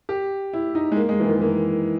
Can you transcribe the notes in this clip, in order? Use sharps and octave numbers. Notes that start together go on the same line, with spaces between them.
G4
E4
D#4
G#3
A#3
G#3
E3
D#3
E3
E3